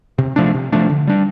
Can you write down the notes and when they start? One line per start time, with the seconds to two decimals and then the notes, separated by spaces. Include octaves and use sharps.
0.18 C3
0.36 F3 A3 D4
0.54 C3
0.72 F3 A3 D4
0.89 D3
1.07 G3 D4